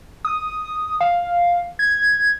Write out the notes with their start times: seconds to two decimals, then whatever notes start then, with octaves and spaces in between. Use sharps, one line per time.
0.25 D#6
1.01 F5
1.79 G#6